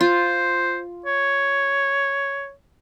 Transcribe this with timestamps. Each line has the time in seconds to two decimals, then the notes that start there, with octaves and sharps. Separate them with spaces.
0.01 F4 C5
1.06 C#5